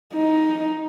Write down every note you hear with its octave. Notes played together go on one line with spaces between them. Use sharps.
D#4